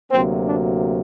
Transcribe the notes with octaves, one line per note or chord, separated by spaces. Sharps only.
D2 C3 F#3 A#3 C4
D4